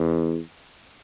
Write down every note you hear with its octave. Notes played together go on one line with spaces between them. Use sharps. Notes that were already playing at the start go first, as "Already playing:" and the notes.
Already playing: E2